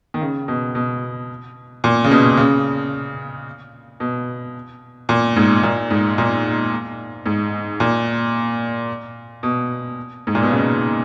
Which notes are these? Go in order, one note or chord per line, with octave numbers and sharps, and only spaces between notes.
D#3
C#3
B2
B2
A#2
C#3
B2
C#3
B2
A#2
G#2
A#2
G#2
A#2
G#2
A#2
B2
G#2
A#2
B2
C#3